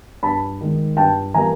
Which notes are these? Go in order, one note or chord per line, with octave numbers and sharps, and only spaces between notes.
G2 A5 B5
D#3 G#3
G2 G5 A5
E3 G3 A#3 G#5 A#5